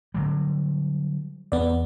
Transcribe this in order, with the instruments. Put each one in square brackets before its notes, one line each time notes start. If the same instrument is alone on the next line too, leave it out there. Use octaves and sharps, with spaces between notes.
[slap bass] D3 F#3 G3
[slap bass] E2 [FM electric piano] B3 D5